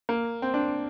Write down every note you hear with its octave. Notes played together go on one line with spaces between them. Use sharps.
A#3
C4
D4